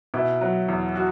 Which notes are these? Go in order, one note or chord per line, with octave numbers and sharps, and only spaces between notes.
B2 E4
F#3
E2
F#4